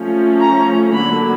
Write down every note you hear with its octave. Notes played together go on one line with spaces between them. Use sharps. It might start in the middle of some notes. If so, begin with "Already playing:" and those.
Already playing: F3 A3 C#4
A#5
D3 F#3 A#3 B5